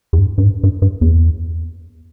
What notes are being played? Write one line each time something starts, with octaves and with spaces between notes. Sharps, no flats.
E2
G2
G2
G#2
G2
G2
E2